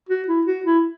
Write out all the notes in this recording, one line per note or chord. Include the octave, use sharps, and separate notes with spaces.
F#4
E4
F#4
E4